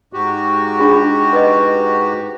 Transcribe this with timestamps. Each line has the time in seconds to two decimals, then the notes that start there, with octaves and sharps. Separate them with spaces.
0.13 G#2 F#4 G4
0.79 D4 F4 G#4
1.33 B4 D#5